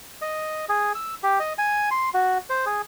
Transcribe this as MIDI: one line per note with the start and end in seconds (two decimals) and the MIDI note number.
0.22 0.65 75
0.69 0.93 68
0.95 1.15 88
1.23 1.39 67
1.40 1.53 75
1.58 1.89 80
1.91 2.09 84
2.14 2.38 66
2.50 2.65 72
2.66 2.82 68